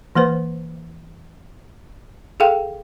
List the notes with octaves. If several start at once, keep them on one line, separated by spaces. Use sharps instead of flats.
E3 A#3 B4 C5
G#4 A4 F5 G5